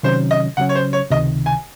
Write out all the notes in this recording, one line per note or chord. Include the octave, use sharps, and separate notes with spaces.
C3 D#3 F#3 C#4 C5
D#5
C#3 F#3 C#4 F#5
C#5
C5
C#5
C#2 C3 D#3 D#5
G#5